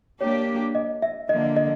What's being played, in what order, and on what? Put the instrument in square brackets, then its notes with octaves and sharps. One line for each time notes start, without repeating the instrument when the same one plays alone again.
[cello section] A#3 D4 G4 [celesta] C#5
[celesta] D#5
E5
[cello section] D3 F3 A#3 [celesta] D#5
[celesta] D#5